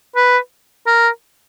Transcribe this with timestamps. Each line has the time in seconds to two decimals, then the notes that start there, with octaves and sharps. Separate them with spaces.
0.16 B4
0.87 A#4